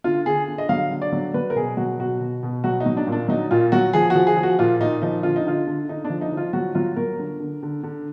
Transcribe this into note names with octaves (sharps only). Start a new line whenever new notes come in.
D3 F4
D3 G#4
D3
D#5
F#3 F5
D3
D5
F#3
F#3 B4
A#4
B2 G#4
F#3 F#4
B2 F#4
B2
B2
F#3 F#4
D#4
F#3
D4
A#2
D4
F#3 D#4
A#2 F4
F#3 F#4
F3 G#4
F#4
F3
G#4
F3
F#4
A#2 F4
A#2 D#4
F3 D#4
D3 F4
D#4
D3 F4
D3
D3 D#4
D4
F3
D#4
F3
F4
F#3 F#4
F#3 F4
F#3 A#4
D3
D3
D3
D3